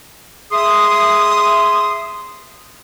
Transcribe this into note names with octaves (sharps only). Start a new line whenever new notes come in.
G#4 E5 C6 D#6